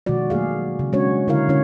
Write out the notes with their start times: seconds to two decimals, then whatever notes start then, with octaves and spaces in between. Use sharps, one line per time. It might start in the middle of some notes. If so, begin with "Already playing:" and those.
0.06 B2 D#3 F3 G#3 F#4 D5
0.30 F#3 A3 A#3 G#4 F5
0.79 C#3
0.93 G#3 C#4 D4 F#4 C#5
1.28 D3 E4 A#4 C#5 F5
1.49 D3 C#4 E4 C#5